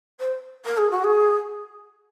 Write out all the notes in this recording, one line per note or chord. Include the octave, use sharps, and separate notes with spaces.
C5
A#4
G#4
F#4
G#4